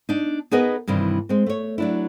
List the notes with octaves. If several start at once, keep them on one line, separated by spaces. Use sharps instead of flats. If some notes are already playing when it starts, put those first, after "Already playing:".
D4 D#4
B3 D#4 G#4 A#4 B4 D#5
G2 C3 D#3 E3
G#3 C4
A3 C#5
F#3 D4 E4